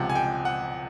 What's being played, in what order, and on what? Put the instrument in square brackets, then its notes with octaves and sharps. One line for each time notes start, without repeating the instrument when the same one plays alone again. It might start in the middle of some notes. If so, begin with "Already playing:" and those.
Already playing: [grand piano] C#2 C3 F3 F#5 G5
G#5
G5
F#5